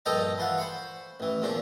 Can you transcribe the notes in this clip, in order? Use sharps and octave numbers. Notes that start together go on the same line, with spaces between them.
A#1 G2 A4 D#5 G5 A#5
E3 F4 F#5
C5 B5 C#6
A1 E3
E2 A#2 F3 D4